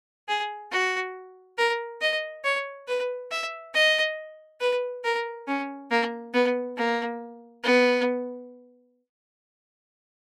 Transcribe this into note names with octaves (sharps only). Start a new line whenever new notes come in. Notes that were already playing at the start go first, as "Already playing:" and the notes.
G#4
F#4
A#4
D#5
C#5
B4
E5
D#5
B4
A#4
C#4
A#3
B3
A#3
B3